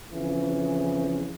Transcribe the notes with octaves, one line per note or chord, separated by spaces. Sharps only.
F2 C#3 E3